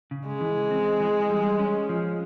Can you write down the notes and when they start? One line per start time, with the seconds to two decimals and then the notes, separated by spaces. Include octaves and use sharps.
0.11 C#3
0.27 G#3
0.41 E3
0.71 C4
1.00 E3
1.30 G3
1.59 C#4
1.89 F3